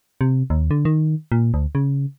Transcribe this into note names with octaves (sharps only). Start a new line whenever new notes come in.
C3
D#2
D3
D#3
A#2
D2
C#3